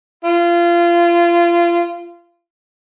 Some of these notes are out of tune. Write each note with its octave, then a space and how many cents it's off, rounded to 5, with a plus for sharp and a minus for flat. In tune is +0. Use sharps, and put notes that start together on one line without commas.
F4 -25